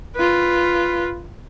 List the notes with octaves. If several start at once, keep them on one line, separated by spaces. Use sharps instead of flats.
F4 B4